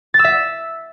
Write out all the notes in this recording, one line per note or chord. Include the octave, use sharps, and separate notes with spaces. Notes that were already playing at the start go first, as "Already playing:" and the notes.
A6
E6
E5